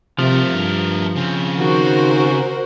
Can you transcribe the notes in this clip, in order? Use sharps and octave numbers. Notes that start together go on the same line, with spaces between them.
C3 F3 A3 A#4
G2
C#3 C4
D#3 F#4 A#4 C5